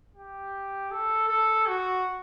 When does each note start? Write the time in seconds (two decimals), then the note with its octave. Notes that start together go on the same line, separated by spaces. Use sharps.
0.16 G4
0.92 A4
1.29 A4
1.67 F#4